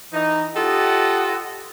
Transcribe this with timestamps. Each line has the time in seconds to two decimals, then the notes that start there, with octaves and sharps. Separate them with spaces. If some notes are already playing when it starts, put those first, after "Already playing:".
0.13 E3 D#4
0.55 F4 G4 A4 D#5 F#5